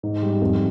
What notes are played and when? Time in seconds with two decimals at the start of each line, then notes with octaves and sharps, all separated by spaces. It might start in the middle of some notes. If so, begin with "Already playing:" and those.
0.03 G#2
0.22 G3
0.42 F2